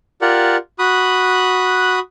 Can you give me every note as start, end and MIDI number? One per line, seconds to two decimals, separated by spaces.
0.21 0.57 65
0.21 0.57 67
0.21 0.57 70
0.21 0.57 74
0.21 0.57 78
0.79 1.99 66
0.79 1.99 83
0.79 1.99 87
0.79 1.99 90